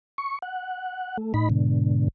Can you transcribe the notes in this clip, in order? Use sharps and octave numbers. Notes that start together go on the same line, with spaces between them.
C#6
F#5
A3
A2 D#4 B5
G#2 B2 D3